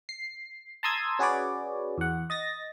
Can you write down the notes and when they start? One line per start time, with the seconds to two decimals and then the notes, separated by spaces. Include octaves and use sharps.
0.09 C7
0.83 A5 A#5 C6 D#6 E6 G#6
1.19 C#4 F#4 G#4 B4 C#5 D5
1.98 E2 F#5
2.30 D#5 A6 A#6